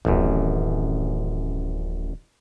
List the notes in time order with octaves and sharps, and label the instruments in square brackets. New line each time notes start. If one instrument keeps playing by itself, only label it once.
[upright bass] D1 D#3 [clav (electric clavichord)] A1 F#2